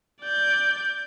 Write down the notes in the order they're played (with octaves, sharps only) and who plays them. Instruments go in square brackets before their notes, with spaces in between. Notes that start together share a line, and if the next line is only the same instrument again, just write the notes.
[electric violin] D5 G6